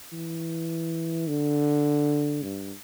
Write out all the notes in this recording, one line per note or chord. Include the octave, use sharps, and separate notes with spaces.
E3
D3
G2